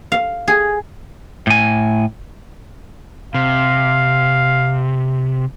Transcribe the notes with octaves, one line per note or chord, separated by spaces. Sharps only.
F5
G#4
A2 G#5
C3 F5